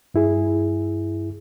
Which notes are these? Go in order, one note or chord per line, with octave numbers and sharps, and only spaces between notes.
G2 E4 G#4